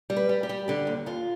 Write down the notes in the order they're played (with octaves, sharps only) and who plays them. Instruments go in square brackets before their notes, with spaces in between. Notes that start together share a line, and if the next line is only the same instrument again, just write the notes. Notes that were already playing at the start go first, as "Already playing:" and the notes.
[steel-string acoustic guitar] G3
B4
G3
G4
G3
D3 G4
D#2
D#2 F4